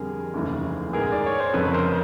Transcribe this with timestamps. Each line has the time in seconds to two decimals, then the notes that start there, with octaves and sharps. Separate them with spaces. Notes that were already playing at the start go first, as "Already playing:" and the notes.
Already playing: F2 D3 G3 G#4 A#4
0.34 F1 D#2 C#3 E3 A3
0.93 G#2 D#3 G#3 B3 G#4 A#4
1.12 D5
1.26 C#5
1.40 C5
1.53 F1 F2 C#3 A4 B4
1.73 A#4 C5